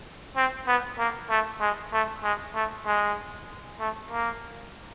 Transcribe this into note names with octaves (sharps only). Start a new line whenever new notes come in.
C4
B3
A#3
A3
G#3
A3
G#3
A3
G#3
A3
A#3